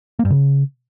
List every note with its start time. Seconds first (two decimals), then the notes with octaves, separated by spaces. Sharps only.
0.19 A#3
0.25 G2
0.30 C#3